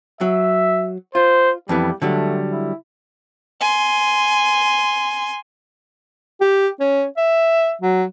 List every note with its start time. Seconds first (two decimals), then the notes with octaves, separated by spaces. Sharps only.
0.21 F#3 E5
1.15 F4 C5
1.69 F2 E3 G3 B3
2.02 D3 F#3 G3 A3
2.51 E4
3.61 G#5 C6
6.41 G4
6.80 C#4
7.17 E5
7.81 F#3